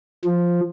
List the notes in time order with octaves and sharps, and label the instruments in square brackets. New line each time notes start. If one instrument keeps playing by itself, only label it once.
[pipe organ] F3